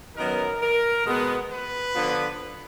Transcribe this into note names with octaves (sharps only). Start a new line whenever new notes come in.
F#2 D#3 F#3 B3 A#4
A#4
B2 G#3 B3
B4
D3 F3 B3